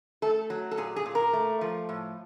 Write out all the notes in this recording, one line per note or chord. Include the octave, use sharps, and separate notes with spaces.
A3 A4
F#3
A4
A#2 G#4
G#4
A#2
A#4
A3
F3
A2